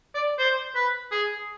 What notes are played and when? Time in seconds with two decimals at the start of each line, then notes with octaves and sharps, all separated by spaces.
0.14 D5
0.39 C5
0.75 B4
1.11 G#4